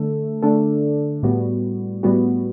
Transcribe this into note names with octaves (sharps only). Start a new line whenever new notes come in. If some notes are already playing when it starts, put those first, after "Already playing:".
Already playing: D3 A3 A4
D3 A3 D4 A4
A2 G3 B3 F#4
A2 G3 B3 F#4